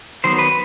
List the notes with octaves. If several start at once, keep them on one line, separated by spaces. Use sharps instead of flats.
D#3 F#3 B3 C5
B4